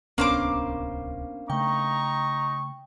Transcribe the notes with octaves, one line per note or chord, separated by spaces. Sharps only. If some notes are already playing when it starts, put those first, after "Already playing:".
D1 C2 A#3 B3 C#4 D4 C5 D6
C#3 A3 D#4 G5 A#5 C#6